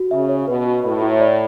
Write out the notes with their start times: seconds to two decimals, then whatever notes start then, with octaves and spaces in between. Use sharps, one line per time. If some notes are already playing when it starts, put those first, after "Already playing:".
Already playing: F#4
0.11 C#3 E5
0.29 C#5
0.47 B2 B4
0.66 F#4
0.83 A2 B4
1.02 E4
1.21 D5